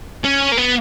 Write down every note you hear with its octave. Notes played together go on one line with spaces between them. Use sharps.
C#4
A#3
B3